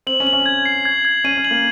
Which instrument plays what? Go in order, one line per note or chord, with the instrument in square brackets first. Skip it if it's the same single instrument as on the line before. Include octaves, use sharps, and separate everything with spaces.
[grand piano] C4 [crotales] F#7
[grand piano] C#4
[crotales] F#7
[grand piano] C#4
[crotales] G#6
C7
G#6
G#6
[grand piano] C#4 [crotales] D#7
[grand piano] C#4
[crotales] F#7
[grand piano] A#3